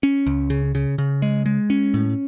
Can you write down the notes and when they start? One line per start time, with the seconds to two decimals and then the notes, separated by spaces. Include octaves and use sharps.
0.03 C#4
0.27 C#2
0.50 C#3
0.75 C#3
0.98 C#3
1.22 G#3
1.46 G#3
1.70 C#4
1.94 A2